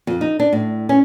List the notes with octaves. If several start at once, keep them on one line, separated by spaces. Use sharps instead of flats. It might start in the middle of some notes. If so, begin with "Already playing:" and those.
F2
D#4
D4
A2
C#4